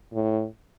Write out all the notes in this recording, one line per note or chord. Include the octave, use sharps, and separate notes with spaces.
A2